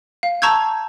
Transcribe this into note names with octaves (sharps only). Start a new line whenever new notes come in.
F5
A5 A#5 C#6 E6 G6 G#6